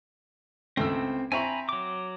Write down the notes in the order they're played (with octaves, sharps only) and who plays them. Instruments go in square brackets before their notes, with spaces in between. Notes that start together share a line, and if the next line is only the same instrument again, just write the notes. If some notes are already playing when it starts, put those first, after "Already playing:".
[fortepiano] C#2 A3 [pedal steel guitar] C4 E6
[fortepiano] C4 E5 C#6 [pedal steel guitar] G#5 A#5 B5
[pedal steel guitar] F#3 D6